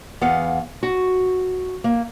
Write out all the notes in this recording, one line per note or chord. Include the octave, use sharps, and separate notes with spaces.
E2 B3 F5 F#5
F#4
A#3